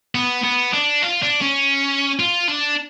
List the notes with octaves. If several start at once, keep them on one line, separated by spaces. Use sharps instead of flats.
B3
B3
D4
F4
D4
C#4
F4
D4